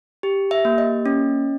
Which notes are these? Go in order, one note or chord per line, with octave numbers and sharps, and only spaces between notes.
G4
E5
A#3
D#5
C#4